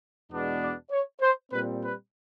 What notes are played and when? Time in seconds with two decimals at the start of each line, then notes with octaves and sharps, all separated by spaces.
0.31 E2 B2 G#3 B3 D4
0.61 D5
0.90 C#5
1.20 C5
1.50 A#2 G3 C4 B4
1.81 B4